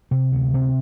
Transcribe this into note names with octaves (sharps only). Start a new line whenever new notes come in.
C3 C4
D2
C3 C4